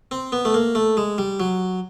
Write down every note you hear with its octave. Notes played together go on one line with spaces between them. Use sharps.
C4
B3
A3
A#3
A3
G#3
G3
F#3